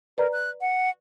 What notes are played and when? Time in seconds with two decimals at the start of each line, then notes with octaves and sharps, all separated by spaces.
0.18 A#4 B4 D5 A#5
0.33 F#6
0.61 F#5